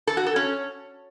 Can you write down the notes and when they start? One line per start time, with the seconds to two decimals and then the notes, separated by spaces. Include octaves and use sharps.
0.07 A4
0.17 F#4
0.26 A4
0.36 C#4